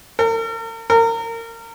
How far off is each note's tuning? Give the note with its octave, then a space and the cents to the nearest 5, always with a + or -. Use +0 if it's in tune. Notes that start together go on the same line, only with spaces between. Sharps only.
A#4 -45
A#4 -30